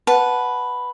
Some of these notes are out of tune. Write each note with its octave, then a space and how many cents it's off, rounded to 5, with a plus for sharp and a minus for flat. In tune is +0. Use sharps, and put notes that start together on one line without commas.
B4 +0 F#5 -5 A5 -15